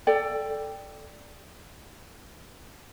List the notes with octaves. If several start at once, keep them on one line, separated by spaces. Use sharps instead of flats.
A4 D5 G5